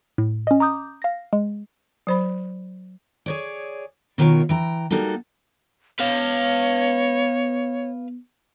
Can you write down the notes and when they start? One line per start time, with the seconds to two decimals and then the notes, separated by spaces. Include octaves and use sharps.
0.18 A2
0.47 C#4 D#5
0.60 A#5 D6 D#6 G6
1.02 F5 A#6
1.33 G#3
2.07 F#3 C5 B5
3.26 G#4 C#5 D5
4.18 B2 D#3 F4 A4 A#4 C#5
4.49 E3 G5 A#5
4.90 G3 A#3 D#4 F#4 A4
5.99 B3 B4 C#5 F5